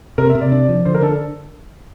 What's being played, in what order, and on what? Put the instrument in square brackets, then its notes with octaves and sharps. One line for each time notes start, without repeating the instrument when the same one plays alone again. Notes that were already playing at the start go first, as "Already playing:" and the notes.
[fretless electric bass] C3 [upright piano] A#4
[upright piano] E5
[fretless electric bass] C3
[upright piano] D5
[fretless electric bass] D4
F3
[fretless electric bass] D3 [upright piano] C5
[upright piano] A#4
[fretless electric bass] D4 [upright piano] A4